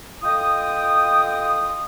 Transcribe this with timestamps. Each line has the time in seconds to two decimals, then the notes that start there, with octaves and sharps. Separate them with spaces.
0.23 F4 A4 D#5 G5 D#6